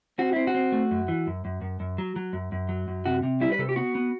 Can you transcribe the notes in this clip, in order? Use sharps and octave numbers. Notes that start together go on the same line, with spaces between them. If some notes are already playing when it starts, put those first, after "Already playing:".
C4 F#4
C4 E4
F#4
C4
A3
F#2
E3
F#2
F#2
F#2
F#2
F#3
F#3
F#2
F#2
F#3
F#2
C3 F#4
C3
G3 E4
B4
C3 A4
G4
B3 F#4
B3